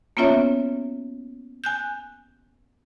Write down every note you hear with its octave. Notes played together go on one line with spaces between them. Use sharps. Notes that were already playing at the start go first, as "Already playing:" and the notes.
A#3 B3 C#4 F4 C#5 E5
G#5 F#6 G6